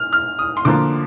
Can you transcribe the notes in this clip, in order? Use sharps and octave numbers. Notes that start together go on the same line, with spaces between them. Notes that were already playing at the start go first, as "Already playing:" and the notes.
Already playing: F6
F6
D#6
C6
D3 F3 A#3 D6